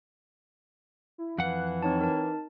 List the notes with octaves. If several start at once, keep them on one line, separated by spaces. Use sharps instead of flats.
E4
F2 E3 F5 F#5 F#6
C4 D#4 C#5 A5
A#4 A5